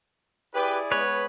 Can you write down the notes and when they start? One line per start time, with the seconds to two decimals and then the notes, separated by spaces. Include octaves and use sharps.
0.54 E4 G4 G#4 B4 D5
0.92 G#3 B3 B4 C#5